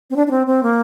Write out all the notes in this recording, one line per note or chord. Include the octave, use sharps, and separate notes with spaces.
C4
D4
D4
C4
C4
A#3